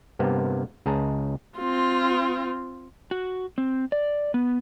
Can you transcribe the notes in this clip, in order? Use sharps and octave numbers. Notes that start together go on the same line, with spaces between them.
G2 C3 A#3 B3
C#2 G#4 A5 A#5
C4 F4
F#4
C4
D5
B3